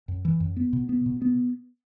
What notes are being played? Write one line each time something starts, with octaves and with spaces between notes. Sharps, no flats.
F#2
E3
F#2
B3
B2
B3
B2
B3